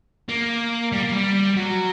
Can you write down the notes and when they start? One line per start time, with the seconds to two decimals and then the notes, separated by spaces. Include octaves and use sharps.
0.29 A#3
0.92 G3
1.03 A#3
1.12 G3
1.57 F#3